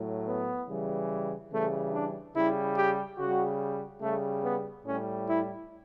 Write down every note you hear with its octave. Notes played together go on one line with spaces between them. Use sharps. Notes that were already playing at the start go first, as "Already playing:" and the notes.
Already playing: A2 F#3
B3
C#3 E3 G3
C#3 E3 G3 A3
D4
C#3 G3 E4
G4
C#3 G3 F#4
C#3 G3 A3
B3
A2 G3 C#4
E4